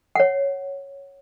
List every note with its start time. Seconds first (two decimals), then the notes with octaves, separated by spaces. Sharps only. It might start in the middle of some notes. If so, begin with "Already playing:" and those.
0.15 C#5 F#5